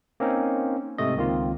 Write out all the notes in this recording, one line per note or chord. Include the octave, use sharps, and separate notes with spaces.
A#3 C4 C#4 D#4
G#2 C3 A3 D#5
C#2 D#3 A#3 C4 F4